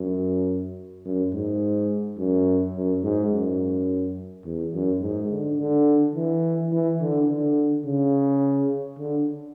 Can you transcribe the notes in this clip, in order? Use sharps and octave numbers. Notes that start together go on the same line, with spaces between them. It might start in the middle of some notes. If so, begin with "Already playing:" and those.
Already playing: F#2
F#2
G#2
F#2
F#2
G#2
F#2
E2
F#2
G#2
D3
D3
E3
E3
D3
D3
C#3
D3